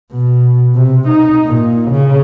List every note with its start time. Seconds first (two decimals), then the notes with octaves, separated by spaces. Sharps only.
0.12 B2
0.76 C3
1.08 D#4
1.46 A#2
1.91 C#3